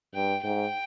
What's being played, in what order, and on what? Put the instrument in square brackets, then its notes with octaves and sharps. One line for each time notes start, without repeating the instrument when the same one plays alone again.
[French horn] G2 [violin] G5
[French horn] G#2 [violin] G5